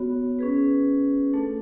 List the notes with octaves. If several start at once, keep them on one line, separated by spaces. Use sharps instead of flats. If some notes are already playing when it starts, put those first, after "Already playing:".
Already playing: B3 F#4 C#5
C#4 G#4 B4
A3 D4 A4